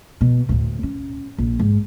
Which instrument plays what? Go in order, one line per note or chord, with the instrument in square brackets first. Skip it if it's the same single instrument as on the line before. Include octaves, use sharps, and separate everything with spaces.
[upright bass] B2
D2 A2
C#4
A#1
G#2